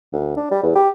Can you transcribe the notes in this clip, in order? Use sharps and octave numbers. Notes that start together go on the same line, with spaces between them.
D2
D4
G3
E2
G4